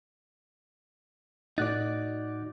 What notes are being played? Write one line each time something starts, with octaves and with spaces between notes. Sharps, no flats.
A2 D#4 F#4 D5 F#6 A6